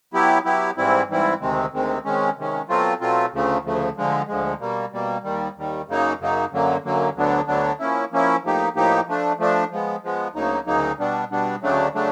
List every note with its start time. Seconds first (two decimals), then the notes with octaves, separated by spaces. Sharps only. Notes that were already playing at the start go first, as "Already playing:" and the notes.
0.14 F#3 B3 E4 G4
0.45 F#3 B3 E4 G4
0.77 G#2 E3 G3 C4 E4
1.08 G#2 E3 G3 C4 E4
1.41 D2 C3 D#3 G#3 C4
1.72 D2 C3 D#3 G#3 C4
2.05 C3 D#3 G#3 C#4
2.37 C3 D#3 G#3 C#4
2.68 B2 F#3 A3 C4 F4
3.00 B2 F#3 A3 C4 F4
3.33 D2 C#3 F3 A3
3.64 D2 C#3 F3 A3
3.97 D2 D3 F3 G#3
4.27 D2 D3 F3 G#3
4.60 B2 G3 A#3
4.92 B2 G3 A#3
5.24 D#2 D#3 G3
5.56 D#2 D#3 G3
5.88 F#2 C#3 F#3 A#3 D#4
6.19 F#2 C#3 F#3 A#3 D#4
6.51 F#2 D3 F#3 A#3
6.84 F#2 D3 F#3 A#3
7.15 D2 D3 F#3 B3 D4
7.48 D2 D3 F#3 B3 D4
7.79 F3 A#3 C#4 E4
8.12 F3 A#3 C#4 E4
8.43 A2 F3 A#3 D#4 G4
8.75 A2 F3 A#3 D#4 G4
9.07 F3 A3 D4
9.38 F3 A3 D4
9.71 F3 G#3 B3
10.03 F3 G#3 B3
10.34 D2 C#3 F#3 A#3 D#4
10.66 D2 C#3 F#3 A#3 D#4
10.98 B2 G3 B3 D4
11.30 B2 G3 B3 D4
11.62 D2 C#3 F#3 A3 D4
11.94 C#3 F#3 A3 D4